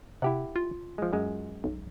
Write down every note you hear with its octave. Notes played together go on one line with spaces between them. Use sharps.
C3 E4 G4 F#5
F4
F3 G#3
F#2 G#3
B1